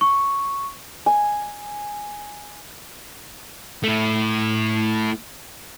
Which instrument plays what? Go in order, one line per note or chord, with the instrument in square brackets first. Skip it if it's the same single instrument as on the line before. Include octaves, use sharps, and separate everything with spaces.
[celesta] C#6
[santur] G#5
[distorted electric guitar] A3 E4